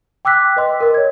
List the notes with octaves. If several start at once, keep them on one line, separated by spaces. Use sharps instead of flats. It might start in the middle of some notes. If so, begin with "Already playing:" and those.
G5 D6 E6 F#6 B6
B4 D#5 C6
A#4 D#5
C#5 G#6